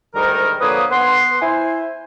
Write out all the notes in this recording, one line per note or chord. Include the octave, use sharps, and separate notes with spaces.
D2 G#2 D#3 G3 D#4 A#4
D3 F3 A#3 B4 C#5 D#6
B3 F#5 C6
E4 C5 G#5